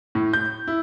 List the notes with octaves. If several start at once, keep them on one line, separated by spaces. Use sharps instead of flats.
A2
G6
E4